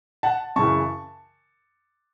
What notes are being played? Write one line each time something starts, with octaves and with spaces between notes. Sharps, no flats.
F#5 A5
F#2 C#3 E3 A5 C#6